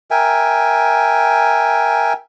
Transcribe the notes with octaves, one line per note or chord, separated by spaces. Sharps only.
A#4 E5 G5 G#5